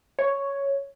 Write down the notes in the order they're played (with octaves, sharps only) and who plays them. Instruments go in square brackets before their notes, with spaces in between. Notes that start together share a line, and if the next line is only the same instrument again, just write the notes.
[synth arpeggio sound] C#5